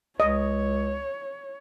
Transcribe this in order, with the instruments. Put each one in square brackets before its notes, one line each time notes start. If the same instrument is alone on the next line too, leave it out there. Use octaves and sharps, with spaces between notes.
[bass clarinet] C#2 [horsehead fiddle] C#5 [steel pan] D#5